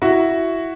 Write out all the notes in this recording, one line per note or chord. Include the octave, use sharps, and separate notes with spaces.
E4 F#4